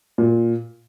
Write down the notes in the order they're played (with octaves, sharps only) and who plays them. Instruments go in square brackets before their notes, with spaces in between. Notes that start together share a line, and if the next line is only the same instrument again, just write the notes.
[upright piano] A#2